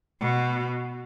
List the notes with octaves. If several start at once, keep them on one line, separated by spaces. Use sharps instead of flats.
B2